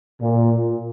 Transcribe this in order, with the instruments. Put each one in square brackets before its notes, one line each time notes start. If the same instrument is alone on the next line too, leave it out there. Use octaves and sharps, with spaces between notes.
[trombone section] A#2